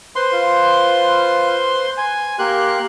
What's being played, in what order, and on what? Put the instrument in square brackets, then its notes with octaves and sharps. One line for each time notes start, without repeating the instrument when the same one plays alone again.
[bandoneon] B4 C5 [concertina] C6
[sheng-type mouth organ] F4
G#5
[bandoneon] A#3 A#4 C6 [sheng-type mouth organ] G4 F#6